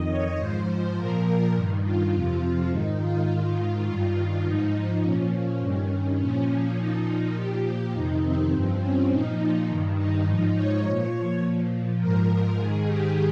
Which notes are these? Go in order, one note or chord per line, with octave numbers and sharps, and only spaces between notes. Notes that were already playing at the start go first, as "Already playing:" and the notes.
Already playing: F2 D#3 D#5
C#5
G#2 F3 C5
A#2 F3 A#4
G2 D#3
F4
F2 C3 F3
G#2 D#3 D#4
F4
G#2 D#3 F4
G2 D#3
G#2 F3 D#4
A#2 F3 C#4
C#4
G2 D#3
A#2 F3 C#4
A#2 F3 D#4
A#2 F3 G4
F2 C3 D#3 D#4
C4
G2 F3
C#4
A#2 F3 D#4
G2 D#3
D#4
G#2 F3
C#5
A#2 F3 C#5
A#2 F3
G#2 F3 A#4
G#2 D#3 G#4
G4